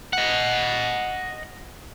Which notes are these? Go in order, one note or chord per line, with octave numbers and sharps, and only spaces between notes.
D#5 F#5